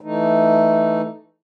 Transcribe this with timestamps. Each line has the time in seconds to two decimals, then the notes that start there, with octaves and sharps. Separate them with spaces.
0.01 E3 A3 D#4